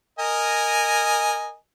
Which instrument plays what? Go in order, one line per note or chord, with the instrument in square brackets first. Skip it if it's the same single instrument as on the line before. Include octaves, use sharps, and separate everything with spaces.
[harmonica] A#4 D#5 G#5